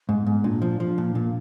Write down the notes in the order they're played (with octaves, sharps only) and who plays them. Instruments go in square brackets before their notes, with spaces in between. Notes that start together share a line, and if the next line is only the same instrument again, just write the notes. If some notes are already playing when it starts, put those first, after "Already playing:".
[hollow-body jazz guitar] G#2
[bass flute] B3
[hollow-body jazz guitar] G#2
[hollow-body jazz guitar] A#2 [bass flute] D4
[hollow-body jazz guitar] F3
F3
A#2
A#2